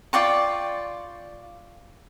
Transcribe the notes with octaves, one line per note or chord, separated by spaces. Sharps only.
F4 D5 G5 C#6